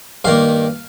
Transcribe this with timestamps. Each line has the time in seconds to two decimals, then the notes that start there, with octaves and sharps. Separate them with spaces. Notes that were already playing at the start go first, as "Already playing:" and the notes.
0.25 G2 D#3 A#3 F5